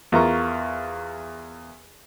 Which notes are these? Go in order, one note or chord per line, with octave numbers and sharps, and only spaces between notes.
E2 F4 A#4 F5 A#5 C#6